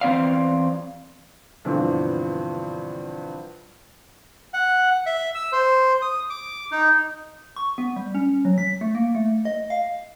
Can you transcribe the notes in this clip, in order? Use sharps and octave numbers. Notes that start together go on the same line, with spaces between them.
E2 C4 D5 F5
G2 B2 D3 E3 F3 C4
F#5
E5
E6
C5
D#6
D6
D#4
C#6
B3
G3
C#4
F#3
B6
A3
A#3
A3
D#5
F5